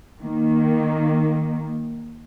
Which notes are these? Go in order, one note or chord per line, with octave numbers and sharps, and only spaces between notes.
D#3 A#3